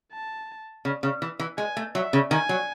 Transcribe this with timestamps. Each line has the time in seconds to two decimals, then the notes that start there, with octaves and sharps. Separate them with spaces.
0.12 A5
0.85 C#3
1.03 C#3
1.22 E3
1.39 E3
1.57 G#3 G#5
1.77 A3
1.95 F#3 E5
2.13 C#3
2.31 D#3 G#5
2.49 F#3